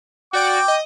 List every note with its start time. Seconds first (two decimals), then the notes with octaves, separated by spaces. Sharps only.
0.33 F#4 D5 G5 D6 D7
0.68 D#5